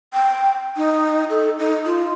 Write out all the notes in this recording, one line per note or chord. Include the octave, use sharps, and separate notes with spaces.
G5
D#4
A4
D#4
F4